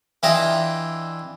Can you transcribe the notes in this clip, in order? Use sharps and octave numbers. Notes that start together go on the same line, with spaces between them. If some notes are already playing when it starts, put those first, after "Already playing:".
E3 D4 E4 F4 G4 D#5